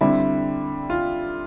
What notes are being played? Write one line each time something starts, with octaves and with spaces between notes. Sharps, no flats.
D3 G3 C4 E4
F4